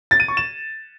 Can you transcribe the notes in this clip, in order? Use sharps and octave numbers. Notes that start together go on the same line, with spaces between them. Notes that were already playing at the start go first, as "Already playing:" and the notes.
A6
D#7
C#6
E7